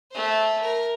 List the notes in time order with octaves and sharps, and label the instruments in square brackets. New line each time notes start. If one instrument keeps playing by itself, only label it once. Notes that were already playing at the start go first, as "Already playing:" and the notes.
[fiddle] A3 C5
A#4